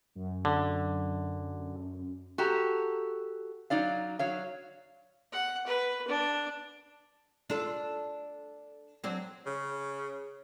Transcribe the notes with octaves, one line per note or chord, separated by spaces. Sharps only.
F#2
D3
F#4 G4 A4 A#5
F#3 D#4 D5 F5
F#3 C#5 F5
F#5
B4
D4
D4 F4 A4
F#3 C4 D4
C#3